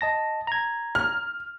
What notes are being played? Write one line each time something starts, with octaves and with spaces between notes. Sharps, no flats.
D#5 A5 A#6
A#5 G#6
F6